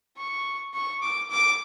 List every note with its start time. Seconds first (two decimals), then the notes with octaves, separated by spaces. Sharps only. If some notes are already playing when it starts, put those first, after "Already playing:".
0.18 C#6
0.74 C#6
1.02 D6
1.30 D6